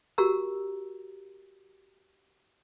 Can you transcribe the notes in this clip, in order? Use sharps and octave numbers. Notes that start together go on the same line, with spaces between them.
F#4 G4 A#4 A#5 E6